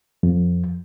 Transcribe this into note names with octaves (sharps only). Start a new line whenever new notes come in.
F2